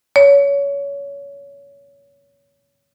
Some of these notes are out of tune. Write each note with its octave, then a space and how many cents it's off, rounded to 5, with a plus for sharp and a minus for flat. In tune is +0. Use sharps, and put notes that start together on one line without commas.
C#5 +25